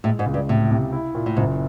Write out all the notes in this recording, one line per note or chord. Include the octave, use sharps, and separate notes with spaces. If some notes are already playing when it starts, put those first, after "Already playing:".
A2 G#3
G#2
C#2
G2
A2 C3
C3
E4
A#2
A2
F#1 G#2